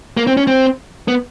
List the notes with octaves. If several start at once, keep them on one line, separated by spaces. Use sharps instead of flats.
A#3
C4
C#4
C4
B3